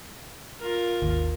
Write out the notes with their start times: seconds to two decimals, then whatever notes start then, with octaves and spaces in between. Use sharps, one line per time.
0.60 F4 A#4
1.02 G#1 D#2 D#3